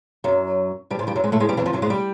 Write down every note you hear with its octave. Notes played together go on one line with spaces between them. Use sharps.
F#2 F#3
G2 G3
G#2 G#3
G2 G3
F#2 F#3
G#2 G#3
A2 A3
G#2 G#3
G2 G3
E2 E3
F2 F3
F#2 F#3
G#2 G#3
G3